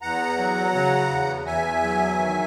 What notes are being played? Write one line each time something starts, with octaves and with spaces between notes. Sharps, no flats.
E2 F#5 A#5
F#3
C#3
E2
E2 E5 G#5
F#3
D#3